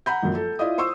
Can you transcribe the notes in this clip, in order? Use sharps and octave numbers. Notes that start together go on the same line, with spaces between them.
F#5 A#5 B5 G6
A#1 F#2
A4
E4 F4 D5 D#5 D#6
C5 C6 C#6 E6